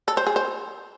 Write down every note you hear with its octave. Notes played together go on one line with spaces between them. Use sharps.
A4
C5
G#4
C5